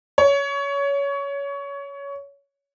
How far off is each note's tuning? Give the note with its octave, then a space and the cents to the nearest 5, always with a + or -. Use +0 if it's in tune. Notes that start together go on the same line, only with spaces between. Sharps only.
C#5 +20